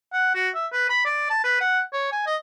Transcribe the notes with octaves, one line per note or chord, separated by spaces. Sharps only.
F#5
F#4
E5
B4
B5
D5
A5
B4
F#5
C#5
G#5
D#5